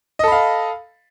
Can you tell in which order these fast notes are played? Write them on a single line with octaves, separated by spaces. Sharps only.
D#5 A4 B5 F5